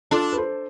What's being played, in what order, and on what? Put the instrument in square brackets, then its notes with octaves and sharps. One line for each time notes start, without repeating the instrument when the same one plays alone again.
[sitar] D4 [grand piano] F4 A4
[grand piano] B4
A4 C5